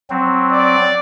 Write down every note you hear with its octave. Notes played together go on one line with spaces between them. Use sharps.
F#3 C4
D5